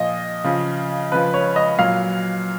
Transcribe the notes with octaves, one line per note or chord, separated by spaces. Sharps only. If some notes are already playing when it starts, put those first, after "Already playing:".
Already playing: A#2 F3 D#5
C#3 F3
C#3 F3 B4
C#5
D#5
A#2 F#3 F5